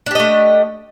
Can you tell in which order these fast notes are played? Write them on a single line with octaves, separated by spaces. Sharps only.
D4 G4 D#5 A3